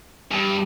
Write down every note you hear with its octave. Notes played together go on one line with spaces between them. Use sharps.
G2